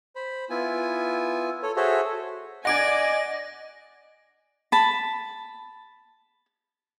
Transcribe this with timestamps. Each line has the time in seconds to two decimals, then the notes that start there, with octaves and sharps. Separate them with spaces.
0.16 C5 B5
0.50 B3 E4 F4 G#5
1.63 A4 C#5
1.76 F#4 G#4 A4 C5 C#5 E5
2.65 D5 D#5 F#5 G#5 D6 G#6 A#6 D7
4.72 A5 B5